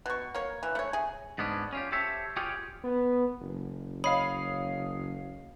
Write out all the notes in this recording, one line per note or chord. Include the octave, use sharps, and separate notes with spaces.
B2 C#6
A#3 C#5
E3
A3 C#5
G#4
G#2 B3 C#4 D4
C#4 F4 G4
G4 A4 C5 C#5 E5
F4 G4 G#4 C#5 F5 G5
B3
F#1
C#5 D#5 F5 B5 D#6 C7